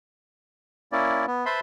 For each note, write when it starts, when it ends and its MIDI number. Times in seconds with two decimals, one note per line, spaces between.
0.92 1.26 58
0.92 1.26 61
0.92 1.26 64
0.92 1.26 74
1.27 1.45 59
1.46 1.60 71
1.46 1.60 72
1.46 1.60 76
1.46 1.60 81
1.46 1.60 83
1.46 1.60 84